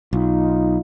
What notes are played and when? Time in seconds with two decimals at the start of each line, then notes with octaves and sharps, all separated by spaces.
0.13 B1 D#4 F4